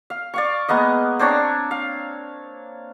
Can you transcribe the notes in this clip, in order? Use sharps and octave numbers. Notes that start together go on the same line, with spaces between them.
F5
D5 F5 C#6
G#3 A#3 B3 D#5
C4 D4 C#5 A#5
F5